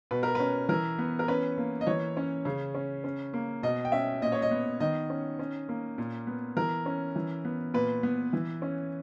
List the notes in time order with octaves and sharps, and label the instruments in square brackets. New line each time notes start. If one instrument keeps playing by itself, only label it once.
[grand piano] B2 B4
A#4
C#4 B4
E3 A#4
B3
A#4
C#4 B4
A#3
D#5
E3 C#5
C#4
C#3
C#4
C#4
A#3
B2 D#5
G5
C#4 E5
A#2 D#5
C#5
D#5
B3
D#3 D#5
C#4
C#4
A#3
A#2
B3
E3 A#4
C#4
E3
B3
A#2 B4
B3
E3
C#4